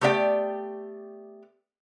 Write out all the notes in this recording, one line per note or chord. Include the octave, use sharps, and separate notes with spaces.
A3 B3 G4 D5 E5 G5